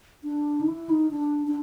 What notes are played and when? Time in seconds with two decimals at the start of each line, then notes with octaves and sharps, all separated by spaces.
0.24 D4
0.61 D#4
0.68 E4
0.89 D#4
1.11 D4
1.47 D4